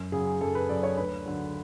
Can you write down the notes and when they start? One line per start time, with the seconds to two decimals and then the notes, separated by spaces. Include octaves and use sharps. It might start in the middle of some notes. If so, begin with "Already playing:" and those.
Already playing: F#2
0.12 C#3 F#3 G#4
0.41 F#2 A4
0.55 B4
0.69 C#3 F#3 D5
0.83 C#5
0.97 D2 B4
1.26 D3 F#3